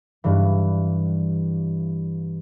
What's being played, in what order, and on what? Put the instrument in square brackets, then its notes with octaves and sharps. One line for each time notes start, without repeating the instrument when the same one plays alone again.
[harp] G2 E3